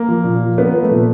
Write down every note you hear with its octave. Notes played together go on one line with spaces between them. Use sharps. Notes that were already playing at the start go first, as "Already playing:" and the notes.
Already playing: A#3
F3
A#2
F3
F3 B3
F3
A3
A#2